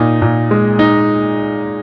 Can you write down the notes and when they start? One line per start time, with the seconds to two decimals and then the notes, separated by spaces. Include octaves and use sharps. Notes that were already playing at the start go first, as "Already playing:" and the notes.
Already playing: A#2 D#4
0.22 A#2
0.51 G#3
0.79 D#4